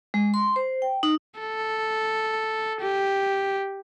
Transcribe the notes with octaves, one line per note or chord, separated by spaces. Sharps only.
G#3
C6
C5
G5
D#4
A4
G4